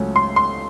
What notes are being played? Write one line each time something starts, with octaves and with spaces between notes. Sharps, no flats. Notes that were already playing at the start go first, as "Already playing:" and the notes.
Already playing: C#2 C#3 F#3 A3 C#4
C6
C6